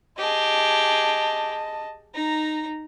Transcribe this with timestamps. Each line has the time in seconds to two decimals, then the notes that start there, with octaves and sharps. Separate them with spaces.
0.18 G4 G#4 D#5 A5
2.15 D#4 A#5